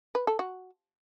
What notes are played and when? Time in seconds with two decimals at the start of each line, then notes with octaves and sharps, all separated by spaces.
0.15 B4
0.27 A4
0.39 F#4